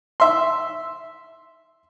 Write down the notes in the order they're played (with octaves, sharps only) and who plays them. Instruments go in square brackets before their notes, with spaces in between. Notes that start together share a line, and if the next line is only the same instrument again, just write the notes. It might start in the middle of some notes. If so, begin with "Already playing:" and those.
[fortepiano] E5 C6